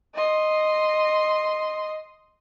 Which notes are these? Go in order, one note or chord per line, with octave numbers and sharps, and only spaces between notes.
D#5 C6